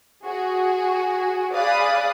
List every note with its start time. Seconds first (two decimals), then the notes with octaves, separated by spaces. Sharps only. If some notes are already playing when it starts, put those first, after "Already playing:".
0.25 F#4 G#4
1.54 G#4 D5 F5 B5 D#6 F#6